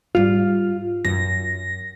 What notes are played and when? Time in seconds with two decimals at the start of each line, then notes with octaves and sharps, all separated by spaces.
0.15 G#2 G3 F4
1.05 F#2 A#6